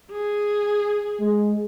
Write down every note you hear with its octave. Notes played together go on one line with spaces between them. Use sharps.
G#4
G#3